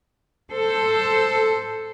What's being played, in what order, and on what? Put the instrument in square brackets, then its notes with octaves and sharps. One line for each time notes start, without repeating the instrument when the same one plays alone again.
[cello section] A4 C5